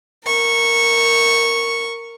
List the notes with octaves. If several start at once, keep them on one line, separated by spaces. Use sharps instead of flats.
A#4 C#6